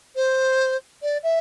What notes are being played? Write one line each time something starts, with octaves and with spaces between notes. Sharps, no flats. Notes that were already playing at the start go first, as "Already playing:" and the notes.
C5
D5
E5